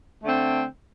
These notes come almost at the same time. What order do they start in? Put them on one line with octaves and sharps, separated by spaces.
A3 D3 C4